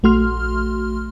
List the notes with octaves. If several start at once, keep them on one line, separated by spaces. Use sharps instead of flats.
A#1 A3 F#4 C6 F6